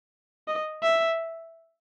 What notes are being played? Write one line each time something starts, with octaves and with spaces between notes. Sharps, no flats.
D#5
E5